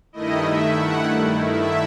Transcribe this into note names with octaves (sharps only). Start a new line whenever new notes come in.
G2 D#3 A3 E4 D#5
E5
F#5
E5